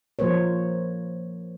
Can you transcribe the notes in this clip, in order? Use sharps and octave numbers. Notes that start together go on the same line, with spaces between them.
F3 A#3 A#4 C5 C#5